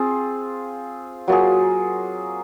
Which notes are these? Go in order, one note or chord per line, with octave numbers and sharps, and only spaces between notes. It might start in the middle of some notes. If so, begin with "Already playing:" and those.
Already playing: C4 F4 G#4
F#3 A#3 F4 G#4